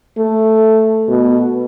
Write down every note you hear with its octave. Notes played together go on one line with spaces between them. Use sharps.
A3
B2